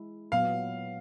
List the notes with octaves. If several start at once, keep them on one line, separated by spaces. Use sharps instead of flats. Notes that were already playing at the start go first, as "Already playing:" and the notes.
Already playing: G#3 E4
A#2 F#3 B3 F5